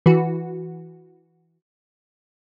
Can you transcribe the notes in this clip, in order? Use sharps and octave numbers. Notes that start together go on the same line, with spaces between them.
E3 F#4